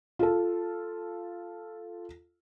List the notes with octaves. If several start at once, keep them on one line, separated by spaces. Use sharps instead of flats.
F4 A4